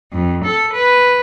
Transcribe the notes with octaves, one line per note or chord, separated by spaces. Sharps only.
F2
A4
B4